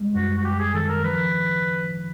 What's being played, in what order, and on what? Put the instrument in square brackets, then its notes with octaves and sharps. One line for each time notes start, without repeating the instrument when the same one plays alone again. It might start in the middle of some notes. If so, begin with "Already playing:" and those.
Already playing: [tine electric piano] G3 G#3
[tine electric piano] F#2 [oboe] F#4
[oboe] F#4
[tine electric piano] F#2 [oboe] G4
[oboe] G#4
[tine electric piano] D#3 [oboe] A4
[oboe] A#4
[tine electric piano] F3 [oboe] B4